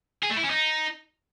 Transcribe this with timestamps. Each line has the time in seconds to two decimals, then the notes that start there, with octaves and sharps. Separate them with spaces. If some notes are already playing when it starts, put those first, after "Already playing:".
0.23 G#4
0.30 A3
0.36 E4
0.43 C#4
0.50 D#4